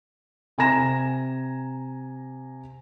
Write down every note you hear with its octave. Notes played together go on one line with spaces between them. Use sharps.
C3 G#5 A#5 A#6 E7